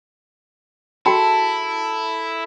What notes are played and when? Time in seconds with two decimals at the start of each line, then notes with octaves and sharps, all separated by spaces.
1.06 E4 F#4 A4 G5 B5